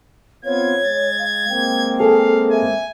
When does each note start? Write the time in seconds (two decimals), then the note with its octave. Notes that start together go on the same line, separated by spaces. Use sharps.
0.45 B3 C4 F4 C#5 G#6
0.83 G#3 A6
1.19 F5
1.50 G#3 A#3 C4 G5
2.00 G#4 A4 F5
2.51 E5 G#5